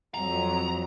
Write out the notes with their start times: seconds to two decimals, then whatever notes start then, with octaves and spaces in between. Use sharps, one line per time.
0.14 F2 F#3 A#5